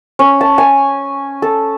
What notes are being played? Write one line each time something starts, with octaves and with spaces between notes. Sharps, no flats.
C#4
A5
G#5
A4